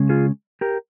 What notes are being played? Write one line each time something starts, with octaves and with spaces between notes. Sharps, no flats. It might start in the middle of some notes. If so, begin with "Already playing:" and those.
Already playing: C#3 G#3 C#4
F4 G#4
G4 A#4